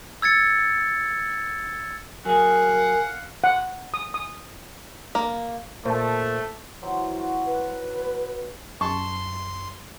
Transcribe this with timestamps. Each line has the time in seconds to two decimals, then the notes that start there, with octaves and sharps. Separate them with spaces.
0.22 E6 G#6 A6 C#7
2.25 F#3 G#4 A#4 F5 F#5 G#5
3.44 F#5
3.94 D#6
4.14 D#6
5.15 A#3
5.86 A#2 A3 C5 A5
6.82 E3 F#3 C5
7.18 F#4
7.46 B4
8.81 F#2 A5 C6 C#6